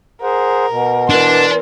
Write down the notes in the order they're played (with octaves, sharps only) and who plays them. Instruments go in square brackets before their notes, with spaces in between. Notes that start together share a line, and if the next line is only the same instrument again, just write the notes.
[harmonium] G#4 C5 F#5 [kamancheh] A#4
[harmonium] B2
[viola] E3 A#4 [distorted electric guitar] D4 [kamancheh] C6